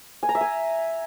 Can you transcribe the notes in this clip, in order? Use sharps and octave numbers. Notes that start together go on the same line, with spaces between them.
G#5
A#5
E5
G#5